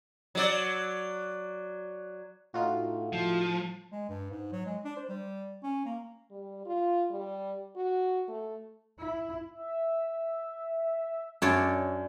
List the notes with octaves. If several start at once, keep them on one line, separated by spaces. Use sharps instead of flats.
F#3 D5
A2 D#4 F4 F#4
F3
G#3
G2
G#2
F#3
G#3
D4
C5
G3
C#4
A#3
G3
F4
G3
F#4
A3
E4
E5
F#2 D4 C#5 D5